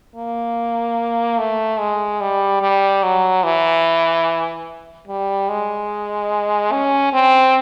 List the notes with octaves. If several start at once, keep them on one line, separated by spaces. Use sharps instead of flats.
A#3
A3
G#3
G3
G3
F#3
E3
G3
G#3
C#4
C4